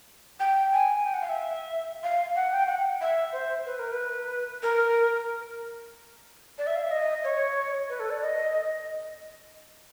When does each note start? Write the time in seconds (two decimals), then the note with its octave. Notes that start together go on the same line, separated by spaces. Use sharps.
0.40 G5
0.73 G#5
1.05 G5
1.14 F#5
1.21 F5
1.29 E5
2.03 F5
2.36 F#5
2.52 G5
2.67 F#5
3.01 E5
3.32 C5
3.66 B4
3.79 A#4
3.92 B4
4.63 A#4
6.58 D5
6.67 E5
6.75 F5
6.83 E5
6.91 D#5
7.24 C#5
7.89 B4
8.00 A4
8.10 D5
8.21 D#5